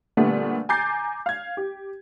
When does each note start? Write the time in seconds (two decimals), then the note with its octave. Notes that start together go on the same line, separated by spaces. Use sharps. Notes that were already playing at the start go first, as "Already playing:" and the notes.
0.17 A#2 D3 G3 A3 B3
0.69 G#5 A#5 D6 G6 A6 C7
1.26 F5 G#6
1.57 G4